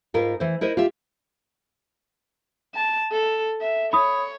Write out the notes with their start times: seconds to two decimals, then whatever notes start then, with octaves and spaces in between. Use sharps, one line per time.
0.14 G#2 F4 A#4 B4
0.40 E3 C5
0.61 E4 A#4 C5 D#5
0.77 F4 G4 E5
2.75 A5
3.12 A4
3.61 E5
3.93 C#5 B5 D#6